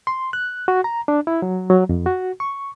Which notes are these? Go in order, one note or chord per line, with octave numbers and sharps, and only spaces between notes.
C6
F#6
F#4
A#5
D4
E4
F#3
F#3
F2
F#4
C#6